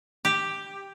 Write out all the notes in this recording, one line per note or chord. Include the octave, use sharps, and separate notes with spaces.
G4